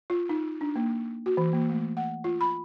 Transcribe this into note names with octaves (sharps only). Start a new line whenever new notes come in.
F4
D#4
D4
A#3
F#4
E3
A#3
A3
F#5
F4
B5